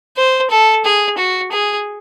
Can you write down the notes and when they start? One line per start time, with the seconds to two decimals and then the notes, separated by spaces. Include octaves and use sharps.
0.17 C5
0.50 A4
0.85 G#4
1.18 F#4
1.52 G#4